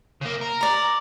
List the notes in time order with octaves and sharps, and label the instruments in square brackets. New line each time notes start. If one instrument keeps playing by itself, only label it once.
[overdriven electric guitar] C#3 A#3
A#4
[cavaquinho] D5 A#5